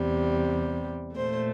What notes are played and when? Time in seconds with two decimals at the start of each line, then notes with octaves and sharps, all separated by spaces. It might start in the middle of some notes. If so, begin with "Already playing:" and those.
Already playing: E2 C3 G3
1.16 A#2 A3 C5